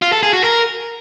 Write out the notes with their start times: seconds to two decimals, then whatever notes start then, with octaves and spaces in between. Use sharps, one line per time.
0.02 F4
0.12 A4
0.23 G#4
0.33 F#4
0.44 A#4